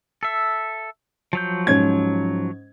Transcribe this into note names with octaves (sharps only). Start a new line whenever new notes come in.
A4 E5
F3 F#3 G6
G#2 C#4 G#6